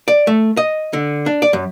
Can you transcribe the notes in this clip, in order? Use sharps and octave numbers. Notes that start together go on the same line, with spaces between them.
D5
A3
D#5
D3
D4
D5
F#2